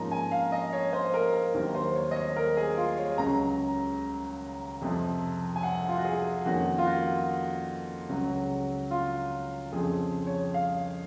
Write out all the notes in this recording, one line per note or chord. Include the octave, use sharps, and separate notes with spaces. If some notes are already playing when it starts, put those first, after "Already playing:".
Already playing: G#2 F3 A#3 C#4 A#5
G#5
F5
D#5
C#5
C5
A#4
A#4
D#2 D#3 F#3 A#3 A#4
C5
C#5
D#5
C#5
A#4
G#4
F4
C#5
C#2 C#3 F#3 A#5
F2 C3 F3
G#5
F#5
F4
F#4
G#4
F2 D#3 A#3 C#4 F#4
F4
F#4
C#2 C#3 F#3
F4
F2 C#3 F3 C4 G#4
C#5
F5